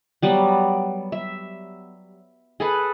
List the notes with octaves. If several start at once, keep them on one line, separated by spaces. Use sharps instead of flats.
F#3 G3 B3
E5
G#4 A4 B4